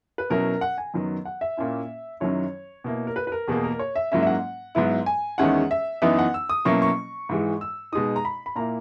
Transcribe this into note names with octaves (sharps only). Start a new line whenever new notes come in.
B4
B2 F#3 C#4 E4 A#4
F#5
G#5
F#2 D#3 F#3 B3
F#5
E5
A#2 A#3 C#4 E4
F#2 D#3 F#3 C#4 E4 C#5
B2 A#3 E4
A#4
B4
B4
A#4
E2 B2 A#3 G#4
A#4
C#5
E5
G#2 F#3 A#3 C#4 E4 E5
E5
F#5
G#2 F#3 B3 E4
G#5
E2 D#3 G#3 C#4 E4 F#5
E5
F#2 E3 B3 D#4 E5
F#5
E6
D#6
B2 F#3 A#3 C#4 E4 C#6
C#6
G#2 E3 G#3
E6
B2 G#3 D#4 D#6
A#5
B5
B5
A#2 A#3 E4 A#5